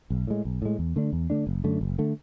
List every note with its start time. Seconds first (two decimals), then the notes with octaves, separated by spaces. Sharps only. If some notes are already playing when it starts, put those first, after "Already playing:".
0.10 B1
0.27 A2 G#3
0.45 B1
0.62 A2 G#3
0.79 E2
0.96 D3 A3 D4
1.13 E2
1.30 D3 A3 D4
1.47 F#1
1.64 F#2 D3 A3
1.81 F#1
1.98 D3 A3